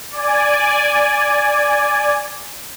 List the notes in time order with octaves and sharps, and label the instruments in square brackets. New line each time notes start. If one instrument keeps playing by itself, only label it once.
[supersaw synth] D5 G#5